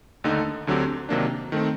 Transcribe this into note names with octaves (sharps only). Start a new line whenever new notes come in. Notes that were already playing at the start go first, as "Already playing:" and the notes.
D#2 D3 A3 D#4 A4
D2 D3 F#3 C4 G4
C3 D#3 F#3 A#3 D4
D#3 A3 C4